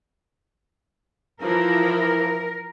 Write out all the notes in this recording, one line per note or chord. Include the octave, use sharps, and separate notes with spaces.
E3 F3 E4 A#4